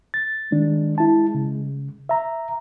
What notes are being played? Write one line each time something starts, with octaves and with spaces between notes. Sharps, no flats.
A6
D#3 G#3 D4
E4 A5
C#3
E5 A#5